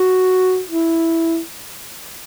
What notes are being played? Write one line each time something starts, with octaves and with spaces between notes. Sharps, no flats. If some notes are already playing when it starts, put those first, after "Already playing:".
Already playing: F#4
E4